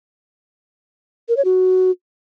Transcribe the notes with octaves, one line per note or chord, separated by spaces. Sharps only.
A#4
C#5
F#4